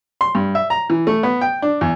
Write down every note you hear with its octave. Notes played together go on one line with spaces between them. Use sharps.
C6
G2
E5
A#5
E3
A3
B3
G5
D4
E2